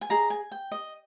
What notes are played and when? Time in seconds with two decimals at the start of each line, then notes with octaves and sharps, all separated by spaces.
0.01 G#5
0.09 G#4 D#5 A#5
0.30 G#5
0.52 G5
0.72 D#5